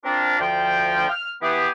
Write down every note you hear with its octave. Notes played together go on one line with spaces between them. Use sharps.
C4 D4 F4 A#4
D2 F3 G5
F6
E3 B3 G4 G#4